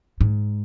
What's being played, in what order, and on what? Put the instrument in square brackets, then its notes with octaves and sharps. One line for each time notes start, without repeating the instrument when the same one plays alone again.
[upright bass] G#2